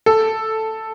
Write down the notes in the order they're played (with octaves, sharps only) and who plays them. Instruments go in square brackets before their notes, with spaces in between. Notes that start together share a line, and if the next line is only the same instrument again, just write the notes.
[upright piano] A4